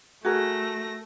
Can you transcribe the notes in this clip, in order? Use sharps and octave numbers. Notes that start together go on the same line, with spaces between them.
A3 F#4 G#4 A#4 A#6